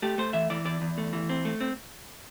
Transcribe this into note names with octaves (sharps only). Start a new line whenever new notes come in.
A3 G4
A3 C5
E3 E5
E3 D5
E2 D5
E2
A3
E3
C4
A3
C4